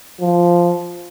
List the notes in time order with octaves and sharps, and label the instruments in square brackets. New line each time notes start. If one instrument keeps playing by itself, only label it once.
[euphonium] F3